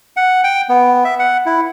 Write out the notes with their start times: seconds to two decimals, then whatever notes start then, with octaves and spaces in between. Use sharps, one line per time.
0.17 F#5
0.44 G5
0.69 B3
1.05 E5
1.19 F#5
1.46 E4